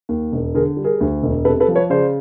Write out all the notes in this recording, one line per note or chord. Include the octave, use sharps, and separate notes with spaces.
D#2
E1
D3 G#4 A#4
G3
G#4 A#4
D2
E1
C3 A4 B4
A4 B4
F3
B4 C#5
C#3 C5 D5